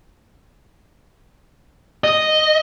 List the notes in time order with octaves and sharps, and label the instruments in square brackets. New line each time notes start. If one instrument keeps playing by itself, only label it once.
[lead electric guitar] D#5